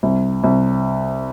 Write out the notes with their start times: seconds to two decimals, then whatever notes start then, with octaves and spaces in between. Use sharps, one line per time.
0.03 C2
0.44 C2